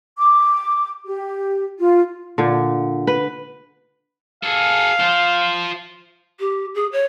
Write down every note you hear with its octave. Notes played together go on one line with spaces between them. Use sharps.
D6
G4
F4
A#2 D3
B4
G#4 A4 F5
F4 C5
G4
G#4
C#5